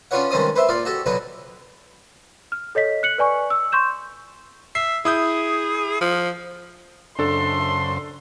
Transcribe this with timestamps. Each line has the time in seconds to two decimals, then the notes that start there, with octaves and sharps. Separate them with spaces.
0.11 C#4 D4 F4 B4 C#5 F#5
0.31 G2 D#3 G#3 C4 C#4 D#6
0.56 B4 C5 E5
0.69 A#2 F4 D5 F5
0.85 F#4 G4 A4
1.06 B2 D3 F#3 F#4 B4
2.52 F6
2.75 A4 C#5 D#5 B6
3.03 F#6 C#7 F#7
3.18 B4 D5 G#5 C#6
3.50 E6
3.72 C6 C#6 G6 E7
4.75 E5 C7
5.05 E4 G#4 D#6 G6
6.01 F3
7.19 F#2 C#3 D4 A4 C5 C6